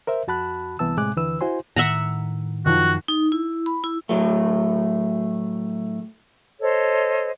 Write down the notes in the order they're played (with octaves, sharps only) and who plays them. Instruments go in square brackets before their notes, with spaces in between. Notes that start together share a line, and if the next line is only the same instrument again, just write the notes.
[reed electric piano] A#4 C5 E5
F2 F#4 A5 B5 F#6
C2 E3 B3 A5 E6
A2 C3 G#3 G#5 D6 F#6
D#2 D3 E3 B4 E6
E4 F#4 C5 G#5 C6
[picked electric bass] A2 D#3 [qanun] E5 F#5 A#5
[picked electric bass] F#2 [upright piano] D#3 F3 [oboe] F#4
[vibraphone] D#4
E4
B5
E4
[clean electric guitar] A2 F#3 A3
[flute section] A4 C5 C#5 D#5